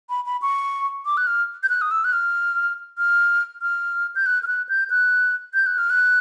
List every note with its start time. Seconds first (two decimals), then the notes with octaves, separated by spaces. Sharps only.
0.10 B5
0.26 B5
0.42 C#6
1.06 D6
1.17 F#6
1.27 F6
1.63 G6
1.69 F#6
1.82 D#6
1.91 E6
2.04 F#6
2.13 F6
2.98 F6
3.62 F6
4.15 G6
4.26 F#6
4.43 F6
4.47 F#6
4.69 G6
4.90 F#6
5.54 G6
5.66 F#6
5.78 F6
5.90 F#6